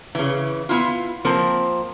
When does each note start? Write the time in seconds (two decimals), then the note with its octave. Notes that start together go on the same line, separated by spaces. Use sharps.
0.15 C#3 E3
0.69 B3 E4 F4
1.25 F3 A#3 C4 A#4